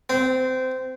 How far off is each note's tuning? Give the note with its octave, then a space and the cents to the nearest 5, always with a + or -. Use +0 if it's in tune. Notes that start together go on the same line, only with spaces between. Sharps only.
C4 -20